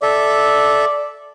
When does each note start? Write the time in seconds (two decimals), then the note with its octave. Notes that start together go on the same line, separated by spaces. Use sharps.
0.03 A4 D5 E5